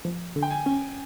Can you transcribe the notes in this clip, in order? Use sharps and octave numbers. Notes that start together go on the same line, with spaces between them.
F3
D3
G5
G#5
C#4